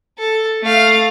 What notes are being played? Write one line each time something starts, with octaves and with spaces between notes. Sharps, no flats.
A4
A3 F5